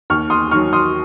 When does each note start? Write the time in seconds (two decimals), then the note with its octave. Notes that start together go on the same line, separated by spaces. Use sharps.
0.10 D#2 C#6 F6
0.30 C6 D#6
0.51 D#3 F#3 C#6 F6
0.73 C6 D#6